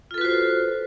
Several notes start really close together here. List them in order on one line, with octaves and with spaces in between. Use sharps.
F4 A4 B4 F#4 C5